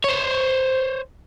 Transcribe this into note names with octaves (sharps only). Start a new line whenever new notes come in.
C5 C#5